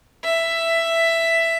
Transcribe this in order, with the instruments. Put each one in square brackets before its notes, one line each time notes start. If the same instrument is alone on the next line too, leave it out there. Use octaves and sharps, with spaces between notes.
[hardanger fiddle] E5